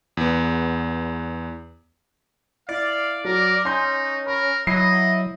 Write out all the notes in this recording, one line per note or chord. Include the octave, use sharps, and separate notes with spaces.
E2 B3
E4 D5 F5
F#3 A#4
C#4 D#4 C6 G6
A#4 B5
F#3 E4 D#5 D#6 C7